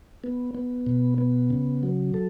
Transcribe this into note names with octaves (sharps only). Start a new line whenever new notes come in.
B3
B3
B2
B3
C#3
F#3
A4